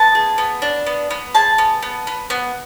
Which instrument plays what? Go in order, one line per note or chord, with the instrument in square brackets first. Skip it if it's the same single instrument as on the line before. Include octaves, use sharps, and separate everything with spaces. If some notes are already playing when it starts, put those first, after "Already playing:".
Already playing: [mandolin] B3 A5
G#4
B3
D4
B3
B3
G#4 A5
B3
B3
B3
B3